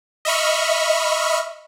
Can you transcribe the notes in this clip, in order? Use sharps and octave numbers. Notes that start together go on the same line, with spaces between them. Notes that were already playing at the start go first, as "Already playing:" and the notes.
D#5 E5 B5 C#6 F6